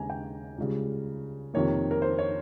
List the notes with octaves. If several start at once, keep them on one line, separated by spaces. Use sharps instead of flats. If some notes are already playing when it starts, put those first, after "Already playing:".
Already playing: D#2 C#3 G#3 C#4 G#5 A#5
G5
C#2 C#3 G3
F2 C3 D#3 A#3 C#5
A#4
C5
C#5